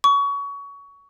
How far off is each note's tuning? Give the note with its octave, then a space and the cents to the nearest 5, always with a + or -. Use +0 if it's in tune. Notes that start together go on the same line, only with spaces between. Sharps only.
C#6 +25